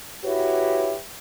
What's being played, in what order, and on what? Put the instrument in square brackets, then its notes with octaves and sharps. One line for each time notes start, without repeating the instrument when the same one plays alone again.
[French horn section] E4 F#4 G4 B4 C#5